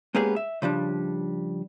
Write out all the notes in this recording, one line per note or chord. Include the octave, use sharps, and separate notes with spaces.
G#3 A#3 B3 C#4 G4 G#4
E5
C#3 F3 G3 D4